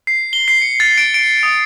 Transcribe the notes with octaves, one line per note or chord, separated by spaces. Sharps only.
C7
G7
C7
C#7
A6
D7
D7
D#6